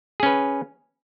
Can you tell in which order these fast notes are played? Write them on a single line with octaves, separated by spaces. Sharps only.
G#4 C#4 B4